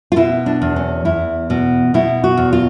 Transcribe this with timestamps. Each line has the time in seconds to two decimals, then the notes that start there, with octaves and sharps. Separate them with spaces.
0.12 F4
0.16 B2 E4
0.46 D4
0.62 E2
0.76 C#4
1.05 E2 E4
1.50 B2
1.94 B2 E4
2.24 F#4
2.37 E2
2.53 F4